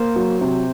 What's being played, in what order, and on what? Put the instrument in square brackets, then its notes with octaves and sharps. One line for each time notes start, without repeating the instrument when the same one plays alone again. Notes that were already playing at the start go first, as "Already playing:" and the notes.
Already playing: [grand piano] A#3 [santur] C5
[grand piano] F#3
C3